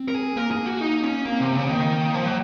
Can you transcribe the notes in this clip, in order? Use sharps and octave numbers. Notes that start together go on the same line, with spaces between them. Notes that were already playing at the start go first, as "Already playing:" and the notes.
Already playing: C4
A#4
G#4
A#3 A#4
G#4
F#4
D#4
C#4
A#3 C4
C3
C#3
D#3 A#3
F3
F#3